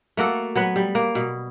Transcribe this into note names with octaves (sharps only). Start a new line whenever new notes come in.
A3 A#3 F#4 A4
F#3 B3 B4
G3
A#3
B2